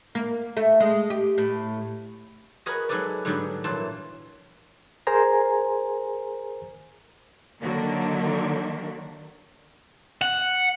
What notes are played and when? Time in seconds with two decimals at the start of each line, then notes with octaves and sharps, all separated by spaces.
0.15 A#3
0.57 A3
0.80 G#3
1.10 G4
1.38 A2
2.66 F#4 G#4 A#4 B4 C#5 D#5
2.89 F#3 G#3 D#4 A4 B4 D5
3.25 G#2 D3 F#3 G3 B3 D4
3.64 A#2 E3 F#3 F4 A5
5.07 G#4 A#4 C5 G#5 A#5
7.61 D3 D#3 F#3 A#3
10.22 F#5